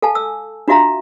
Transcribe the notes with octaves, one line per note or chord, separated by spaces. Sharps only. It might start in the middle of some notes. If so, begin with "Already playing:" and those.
A4 F5 G#5 A5
E6
D4 F4 F#4 E5 F5 A#5